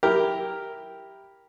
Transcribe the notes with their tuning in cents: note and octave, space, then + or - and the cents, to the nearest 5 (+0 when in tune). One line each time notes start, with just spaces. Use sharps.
E4 +0 G4 +0 A#4 +0